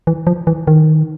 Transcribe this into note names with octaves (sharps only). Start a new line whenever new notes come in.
E3
F3
E3
D#3